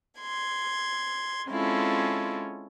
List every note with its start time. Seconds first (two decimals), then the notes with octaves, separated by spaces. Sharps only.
0.20 C6 G#6
1.48 G#3 C4 C#4 E4 F4 A4